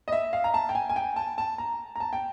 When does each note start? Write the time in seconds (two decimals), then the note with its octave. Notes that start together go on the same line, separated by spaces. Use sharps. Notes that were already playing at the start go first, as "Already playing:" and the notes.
0.08 D#5
0.12 E5
0.33 F5
0.44 A#5
0.54 A5
0.69 G5
0.75 G#5
0.89 G#5
0.96 G5
1.16 A5
1.38 A5
1.58 A#5
1.95 A#5
2.00 A5
2.13 G5